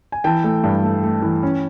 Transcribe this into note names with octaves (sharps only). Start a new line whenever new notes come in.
G#5
E3 G5 A5
A3
G2
A3
A3
E3
C#4